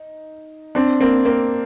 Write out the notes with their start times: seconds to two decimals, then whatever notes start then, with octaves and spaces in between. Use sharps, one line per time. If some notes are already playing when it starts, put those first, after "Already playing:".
Already playing: D#4
0.75 C4 D4
1.01 A#3 C4
1.25 A#3 C4